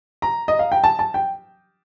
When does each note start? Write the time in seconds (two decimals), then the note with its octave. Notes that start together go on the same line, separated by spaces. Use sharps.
0.22 A#5
0.48 D#5
0.59 F5
0.72 G5
0.84 A5
0.99 A5
1.14 G5